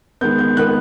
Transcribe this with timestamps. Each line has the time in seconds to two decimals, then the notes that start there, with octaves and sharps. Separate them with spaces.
0.21 D#3 G#3 B3 G6
0.39 G6
0.56 D#3 G#3 B3 F#6